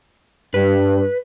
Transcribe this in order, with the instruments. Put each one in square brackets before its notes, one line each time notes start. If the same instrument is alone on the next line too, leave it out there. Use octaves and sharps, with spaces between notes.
[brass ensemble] G2 [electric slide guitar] B4